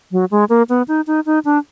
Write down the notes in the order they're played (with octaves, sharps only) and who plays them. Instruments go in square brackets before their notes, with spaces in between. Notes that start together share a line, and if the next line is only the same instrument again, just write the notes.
[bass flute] F#3
G#3
A#3
B3
D#4
D#4
D#4
D4